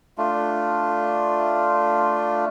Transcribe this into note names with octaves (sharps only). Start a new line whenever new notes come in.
A3 D4 F4